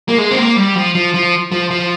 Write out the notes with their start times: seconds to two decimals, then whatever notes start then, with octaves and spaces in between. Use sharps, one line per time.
0.08 A#3
0.18 G#3
0.31 C4
0.37 A#3
0.56 G3
0.75 F3
0.95 F3
1.14 F3
1.52 F3
1.70 F3